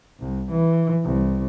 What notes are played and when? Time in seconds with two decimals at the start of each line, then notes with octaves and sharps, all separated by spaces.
0.20 C2
0.51 E3
1.04 C2